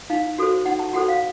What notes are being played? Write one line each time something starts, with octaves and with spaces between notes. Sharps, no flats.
D#4 F5
F#4 A4 C5
D#4 F#5
A5
F#4 A4 C5 F#5
F5